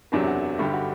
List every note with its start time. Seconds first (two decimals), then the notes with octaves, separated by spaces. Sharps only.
0.12 F#1 E2 C3 F#3 D4
0.27 F#4
0.58 G1 G2 D3 G3 G4
0.73 F#4